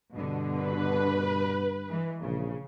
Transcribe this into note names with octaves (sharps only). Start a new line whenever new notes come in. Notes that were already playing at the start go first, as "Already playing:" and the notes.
G2 B2 D3
B4
E3 G#3
A#1 C#3